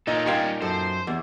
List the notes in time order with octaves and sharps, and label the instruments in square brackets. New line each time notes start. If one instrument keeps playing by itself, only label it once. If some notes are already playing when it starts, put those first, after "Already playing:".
[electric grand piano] A#2 D#4 D#5 [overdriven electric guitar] C#4 A4
[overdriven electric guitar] G3 C#4 [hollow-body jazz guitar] F5 G5 C6
[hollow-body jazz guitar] F#2 A4 [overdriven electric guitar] C5
[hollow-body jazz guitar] E2